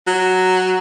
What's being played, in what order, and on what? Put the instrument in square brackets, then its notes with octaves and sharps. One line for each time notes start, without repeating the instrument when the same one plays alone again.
[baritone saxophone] F#3